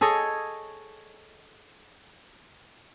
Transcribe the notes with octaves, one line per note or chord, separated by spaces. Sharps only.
G#4 A4 C#5 D#5